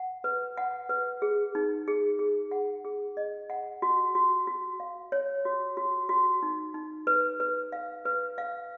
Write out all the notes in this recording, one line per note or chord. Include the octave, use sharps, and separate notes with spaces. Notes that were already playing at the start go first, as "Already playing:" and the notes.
Already playing: F#5
B4
F#5
B4
G#4
D#4
G#4
G#4
F#5
G#4
D#5
F#5
F#4
F#4
F#4
F5
C#5
F#4
F#4
F#4
D#4
D#4
B4
B4
F5
B4
F5